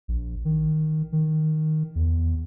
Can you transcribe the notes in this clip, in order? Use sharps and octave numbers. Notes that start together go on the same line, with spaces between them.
A#1
D#3
D#3
E2